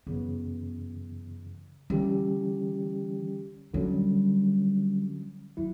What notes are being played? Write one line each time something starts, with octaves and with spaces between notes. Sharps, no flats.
F#2 C#3 E3 B3
D3 E3 G3 C#4 G4
D3 F#3 G3 C#4
F#3 E4